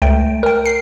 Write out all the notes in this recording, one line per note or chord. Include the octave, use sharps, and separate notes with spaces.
C#2 A3 G5
A#4 G5
C7